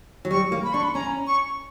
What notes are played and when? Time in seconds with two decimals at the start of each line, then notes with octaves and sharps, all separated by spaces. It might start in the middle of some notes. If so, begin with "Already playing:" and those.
0.25 F#3
0.31 G3 C#6
0.52 A#3
0.63 B5
0.73 D4 C#6
0.83 B5
0.95 C#4 A#5
1.27 C#6